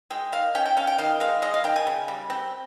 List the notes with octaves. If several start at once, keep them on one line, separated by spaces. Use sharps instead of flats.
G#3 G5
D#3 F5
C#4 G5
G5
C#4 F5
G5
D#3 F5
G#3 F5
G#3 D#5
F5
D#3 G5
G#5
C#3
G3
C4 G5